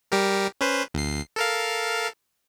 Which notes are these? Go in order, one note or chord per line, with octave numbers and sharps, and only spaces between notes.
G3 G4 A#4
C#4 B4 C5
D2 C7
A4 A#4 F5